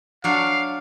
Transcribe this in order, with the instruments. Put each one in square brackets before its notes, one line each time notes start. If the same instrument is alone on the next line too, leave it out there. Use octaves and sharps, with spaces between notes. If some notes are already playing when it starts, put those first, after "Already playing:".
[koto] F#3 D4 C#5 [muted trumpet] F5